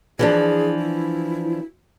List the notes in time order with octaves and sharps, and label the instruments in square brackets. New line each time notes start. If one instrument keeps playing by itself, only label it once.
[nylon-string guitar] E3 F3 D4 [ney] G#4
[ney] E4